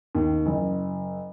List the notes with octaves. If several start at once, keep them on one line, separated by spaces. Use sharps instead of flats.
D#2
F#1